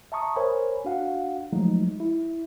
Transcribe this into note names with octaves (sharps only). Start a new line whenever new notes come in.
E5 A5 A#5 C#6 D#6
A#4 C5 C#5 G#5 B5
D4 F#4 F5 F#5
F3 F#3 G#3 A3 D#4
E4